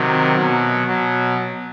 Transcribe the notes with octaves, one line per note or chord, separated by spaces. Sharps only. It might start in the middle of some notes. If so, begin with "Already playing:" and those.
Already playing: C3 D#3 F#3
B2 F#3
B2 F#3